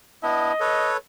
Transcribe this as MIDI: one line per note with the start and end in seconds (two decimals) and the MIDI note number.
0.23 0.52 59
0.23 0.52 62
0.23 0.52 64
0.23 0.93 75
0.60 0.97 69
0.60 0.97 71
0.60 0.97 73